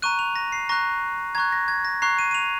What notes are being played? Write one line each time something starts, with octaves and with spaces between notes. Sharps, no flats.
A#5 C#6 F#6 D#7
F7
A#6
C7
A#5 C#6 F#6 A#6
A#5 C#6 F#6 G#6
A#6
G#6
A#6
A#5 C#6 F#6 C7
D#7
D#7
F7